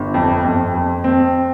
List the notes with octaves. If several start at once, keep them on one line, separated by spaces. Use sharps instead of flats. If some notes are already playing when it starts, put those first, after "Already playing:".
Already playing: G1
F2
F2
F2
C4